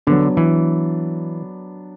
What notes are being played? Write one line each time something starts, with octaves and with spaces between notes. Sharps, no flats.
D3 F#3 B3 D4
E3